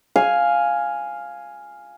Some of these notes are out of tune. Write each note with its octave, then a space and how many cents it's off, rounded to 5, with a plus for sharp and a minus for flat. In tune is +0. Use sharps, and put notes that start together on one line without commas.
F5 +0 G#5 +0